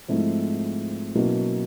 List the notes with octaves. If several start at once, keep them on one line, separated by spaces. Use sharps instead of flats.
G#2 F3 A3 C4 E4
B2 F#3 A#3 C#4 E4